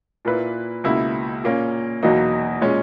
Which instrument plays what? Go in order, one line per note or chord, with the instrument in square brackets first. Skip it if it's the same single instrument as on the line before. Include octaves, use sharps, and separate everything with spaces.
[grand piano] A#2 A#3 E4 B4
C#2 B2 A#3 E4
A#2 A#3 C#4
E2 B2 F#3 A#3 D#4
A#2 G#3 C#4